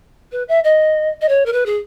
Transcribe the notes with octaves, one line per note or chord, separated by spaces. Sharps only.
B4
E5
D#5
D#5
C#5
A#4
B4
G#4